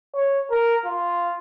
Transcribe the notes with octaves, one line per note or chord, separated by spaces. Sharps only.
C#5
A#4
F4